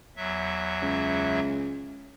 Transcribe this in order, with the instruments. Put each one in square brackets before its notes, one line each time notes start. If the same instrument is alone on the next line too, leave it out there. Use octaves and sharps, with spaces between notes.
[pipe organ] E2 F#3 E5
[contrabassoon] C#2